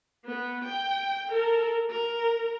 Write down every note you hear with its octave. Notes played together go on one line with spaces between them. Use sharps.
B3
G5
A4 A#4
A#4